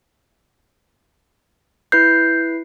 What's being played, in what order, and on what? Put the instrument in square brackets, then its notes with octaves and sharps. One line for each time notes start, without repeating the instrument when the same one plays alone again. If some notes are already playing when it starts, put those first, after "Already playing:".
[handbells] E4 B4 C7 [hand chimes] G6